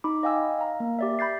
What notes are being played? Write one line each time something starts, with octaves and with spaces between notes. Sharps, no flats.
D#4 B5 D6
D#5 F5 G5 G#5 E6
F5 A#5
A#3
G4 D5 E5
B5 G6 A6 C7